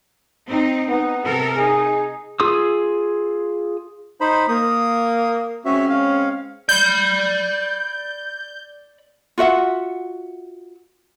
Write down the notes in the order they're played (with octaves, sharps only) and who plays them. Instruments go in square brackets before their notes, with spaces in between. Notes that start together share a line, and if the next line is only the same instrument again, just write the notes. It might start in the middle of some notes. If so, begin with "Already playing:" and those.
[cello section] C4 D#4
[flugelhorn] B3 [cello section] D#4
[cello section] C3 A4 A#4
[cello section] D#4 [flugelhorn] G#4
[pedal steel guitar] F4 G#4 C6 D#6 E6
[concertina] D#4 C5 B5
[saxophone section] A#3 [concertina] D#6
[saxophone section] G#3 C4 C#4 [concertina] F#4 E5
[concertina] F5
[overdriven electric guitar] D5 B5 [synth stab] G6
[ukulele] F4 F#4 E5 F#5